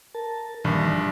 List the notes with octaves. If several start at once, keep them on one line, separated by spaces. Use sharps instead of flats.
A#4 A5
A#1 G2 A#2 D#3 E3